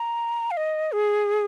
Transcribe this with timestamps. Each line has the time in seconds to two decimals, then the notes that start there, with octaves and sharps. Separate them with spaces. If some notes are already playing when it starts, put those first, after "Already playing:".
Already playing: A#5
0.51 F5
0.57 D#5
0.92 G#4